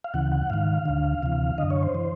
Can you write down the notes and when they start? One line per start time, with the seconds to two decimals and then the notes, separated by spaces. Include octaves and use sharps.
0.04 F5
0.14 D2 C#3 E3 F#5
0.32 F#5
0.50 G#2 D#3 F5
0.85 D2 D3
1.22 D2 C3 E3
1.58 F#2 D3 D#5
1.70 C#5
1.83 C5
1.94 E3